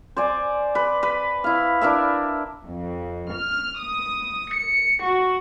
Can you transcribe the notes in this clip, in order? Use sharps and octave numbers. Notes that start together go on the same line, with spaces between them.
C5 D5 G#5
B4
B4
E4 F5
D4 E4 A#4 E5
F2
F6
D#6
C#7
F#4